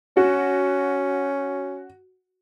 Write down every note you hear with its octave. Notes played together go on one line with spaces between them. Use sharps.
C#4 F#4